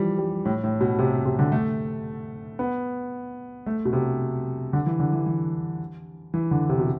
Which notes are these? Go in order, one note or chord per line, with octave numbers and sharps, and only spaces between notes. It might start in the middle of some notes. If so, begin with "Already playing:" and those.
Already playing: E3 F3 G3
G3
A2
A2
B2
C3
C3
D3
A3
B3
A3
B2
C3
D3
E3
D3
E3
E3
E3
D3
C3
B2